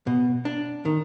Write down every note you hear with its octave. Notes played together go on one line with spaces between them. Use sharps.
B2
D4
D#3